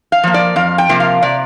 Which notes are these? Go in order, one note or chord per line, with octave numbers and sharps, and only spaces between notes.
F5
F3 A#3
D5
F2 F5
G5
C3 F3 A#3
F5
C3 D5